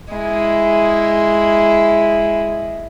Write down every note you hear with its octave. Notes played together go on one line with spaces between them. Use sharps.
G#3 E4